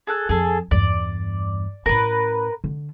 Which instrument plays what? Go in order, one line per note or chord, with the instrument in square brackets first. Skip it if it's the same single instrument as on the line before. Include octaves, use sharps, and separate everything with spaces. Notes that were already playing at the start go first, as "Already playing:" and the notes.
[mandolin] G#4 A4 F#6
[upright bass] F2 [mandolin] G#4 A4
[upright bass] E2 G2 [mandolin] D5
[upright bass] A2 C#4 [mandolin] A#4 B4
[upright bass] D3